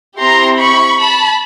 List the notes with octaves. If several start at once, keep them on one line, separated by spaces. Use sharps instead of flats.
C4 E4 G4 A#5 C6
B5 C#6
A5 B5